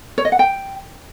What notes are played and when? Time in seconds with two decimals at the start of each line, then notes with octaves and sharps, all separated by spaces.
0.18 C#5
0.25 D#5
0.32 F#5
0.39 G5